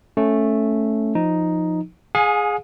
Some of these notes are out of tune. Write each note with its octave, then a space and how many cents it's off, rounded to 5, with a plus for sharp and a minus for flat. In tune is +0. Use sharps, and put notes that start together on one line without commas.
A3 +0 C#4 +0
F3 +0 D#4 +0
G#4 +0 F5 +45 G#5 +25